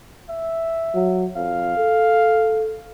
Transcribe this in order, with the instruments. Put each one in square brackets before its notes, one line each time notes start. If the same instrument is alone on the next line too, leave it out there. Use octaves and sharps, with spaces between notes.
[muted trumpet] E5
[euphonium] F#3
[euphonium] F2 [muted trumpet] F5
[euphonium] A4